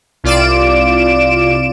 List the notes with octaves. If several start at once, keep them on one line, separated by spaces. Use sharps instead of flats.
C2 F4 D5 D7 E7